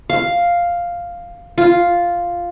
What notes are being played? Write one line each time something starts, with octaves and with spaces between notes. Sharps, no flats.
F5
F4